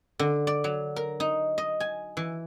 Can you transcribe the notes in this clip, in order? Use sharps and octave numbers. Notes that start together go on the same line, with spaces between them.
D3
D5
F#3
A#4
D#4
D#5
G#5
E3